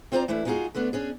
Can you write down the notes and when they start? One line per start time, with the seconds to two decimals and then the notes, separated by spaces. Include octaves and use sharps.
0.12 C4 F4 C5 D5 F#5 A#5
0.28 E3 A3 D4 E4
0.45 G#3 B3 D#4 F4 F#4 G#4
0.75 D3 A3 B3 D4
0.93 C#4 D4 G#4